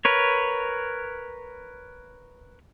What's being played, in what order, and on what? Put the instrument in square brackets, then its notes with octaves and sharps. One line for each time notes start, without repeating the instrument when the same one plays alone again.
[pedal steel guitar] A#4 B4 C#5